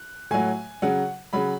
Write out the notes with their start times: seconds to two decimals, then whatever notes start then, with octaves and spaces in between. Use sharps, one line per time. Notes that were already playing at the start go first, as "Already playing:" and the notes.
Already playing: F#6
0.31 A2 F#3 G#5
0.82 C#3 F#3 F#5
1.33 C#3 F#3 B5